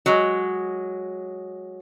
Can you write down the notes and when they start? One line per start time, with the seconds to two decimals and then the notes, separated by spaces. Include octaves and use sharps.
0.06 F#3 G#3